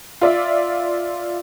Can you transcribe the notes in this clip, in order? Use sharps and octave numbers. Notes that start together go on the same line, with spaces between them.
F4 D5 E5